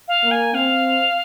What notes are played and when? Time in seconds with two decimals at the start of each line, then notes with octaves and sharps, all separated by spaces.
0.08 F5
0.24 A#3
0.31 G#5
0.54 C4 F5